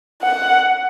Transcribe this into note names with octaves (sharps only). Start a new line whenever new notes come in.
F#5